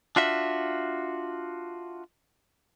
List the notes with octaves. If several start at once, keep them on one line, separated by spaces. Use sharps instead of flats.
D4 F4 F#4 E5